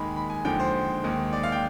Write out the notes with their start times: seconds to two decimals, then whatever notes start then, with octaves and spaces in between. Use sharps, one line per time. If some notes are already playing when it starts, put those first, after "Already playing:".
Already playing: D#2 D#3 G#3 B5
0.16 B5
0.30 G#5
0.45 D#2 D3 F3 G#3 G5
0.60 C5
1.04 D#2 D#3 G#3
1.33 D5
1.43 F5
1.52 G5